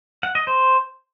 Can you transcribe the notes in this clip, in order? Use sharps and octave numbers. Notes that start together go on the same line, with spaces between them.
F#5
D#5
C5